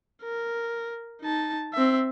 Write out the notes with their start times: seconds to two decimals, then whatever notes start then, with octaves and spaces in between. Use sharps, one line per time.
0.23 A#4
1.21 D#4 A5
1.73 C4 E5